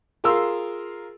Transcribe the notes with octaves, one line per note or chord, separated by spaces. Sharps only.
F4 G#4 A#4 F5 C6 E6